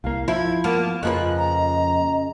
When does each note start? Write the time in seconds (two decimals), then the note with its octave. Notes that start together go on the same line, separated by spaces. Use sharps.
0.04 C2 A#3 F5
0.28 F3 E4 G#6
0.64 A#3 B3 A5
1.03 F2 C#3 F3 A#3 B4 D#5 F#6
1.38 A#5